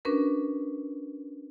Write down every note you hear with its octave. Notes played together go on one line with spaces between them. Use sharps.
C#4 D4 F#4 A#4 B4